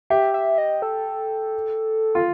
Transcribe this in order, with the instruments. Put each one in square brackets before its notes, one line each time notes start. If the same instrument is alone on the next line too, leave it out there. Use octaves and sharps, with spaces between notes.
[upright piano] G4 [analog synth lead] E5
[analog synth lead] E5
D#5
A4
[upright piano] F4